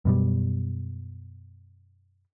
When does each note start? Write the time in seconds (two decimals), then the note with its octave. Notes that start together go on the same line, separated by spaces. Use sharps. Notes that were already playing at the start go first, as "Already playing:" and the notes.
0.05 F#2 B2 G3